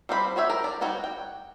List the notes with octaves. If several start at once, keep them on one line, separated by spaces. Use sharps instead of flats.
G3 C4 C5 F5 B5
F#4 G4 C#5 E5
A#4 G5
D5
G3 D#4 F#4 C#5 G5
G5